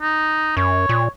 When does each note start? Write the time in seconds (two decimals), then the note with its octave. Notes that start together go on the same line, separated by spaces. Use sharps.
0.02 D#4
0.57 F#2 C#5
0.89 A#2